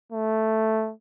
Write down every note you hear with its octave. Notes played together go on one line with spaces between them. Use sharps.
A3